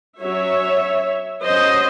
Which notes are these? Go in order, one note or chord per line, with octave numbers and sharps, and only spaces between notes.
F#3 C#4 C#5 E5
F#3 C#4 C5 D#5